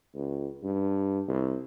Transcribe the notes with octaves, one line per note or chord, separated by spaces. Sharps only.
C#2
G2
C2